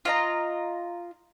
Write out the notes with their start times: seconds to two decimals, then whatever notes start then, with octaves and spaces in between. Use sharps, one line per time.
0.05 F4 D#5 A#5